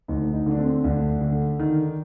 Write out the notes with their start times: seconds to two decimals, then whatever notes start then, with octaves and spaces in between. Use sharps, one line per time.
0.08 D2 D#4
0.33 D#4
0.46 D3 D4
0.59 C4
0.84 D2 D4
1.21 D3
1.59 D#3